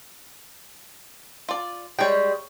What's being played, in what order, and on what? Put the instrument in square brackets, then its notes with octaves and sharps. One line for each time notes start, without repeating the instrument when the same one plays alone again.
[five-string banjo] F4 D5
[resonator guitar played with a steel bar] G3 G#3 [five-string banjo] C#5 G5